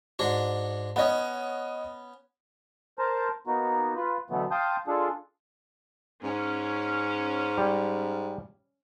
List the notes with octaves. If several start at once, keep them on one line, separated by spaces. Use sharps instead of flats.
G#2 D4 F#4
B3 C#4 C#5 D#5 F#5
A#4 C5 A5 A#5
A#3 B3 D#4 F#4
F4 B4
B2 D3 E3 F#3 A3 B3
F5 G5 A5 C6 D#6 G6
G#3 D4 F4 G#4 A4
G#2 C#4
G3